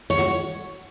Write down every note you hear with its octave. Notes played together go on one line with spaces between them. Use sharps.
C#5
F#4
C#5